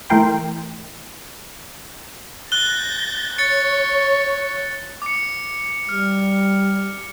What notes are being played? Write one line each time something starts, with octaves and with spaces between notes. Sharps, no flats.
E3 A3 E4 A#4 G5 C6
F#6 G6 A6 A#6 G7
C#5 C#6 A6 C#7
D6 C#7
G3 F6